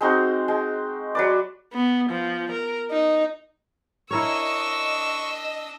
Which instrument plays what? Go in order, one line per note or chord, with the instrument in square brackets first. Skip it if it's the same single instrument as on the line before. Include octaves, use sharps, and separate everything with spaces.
[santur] G#3 C4 D#4 F#4
G#3
F#3 B4 D5
[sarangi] B3
F3
A#4
D#4
[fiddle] D4 E6 [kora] E4 A#4 C#5 [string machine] D#5 [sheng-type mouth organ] C#6